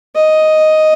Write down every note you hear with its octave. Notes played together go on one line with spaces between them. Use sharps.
D#5